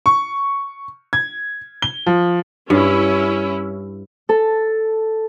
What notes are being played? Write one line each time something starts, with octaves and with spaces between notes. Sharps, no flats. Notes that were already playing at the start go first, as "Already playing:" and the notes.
C#6
G#6
G7
F3
G2 C#4 E4
A4